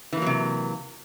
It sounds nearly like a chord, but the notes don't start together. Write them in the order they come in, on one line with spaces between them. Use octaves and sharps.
E3 A#3 F#3 C3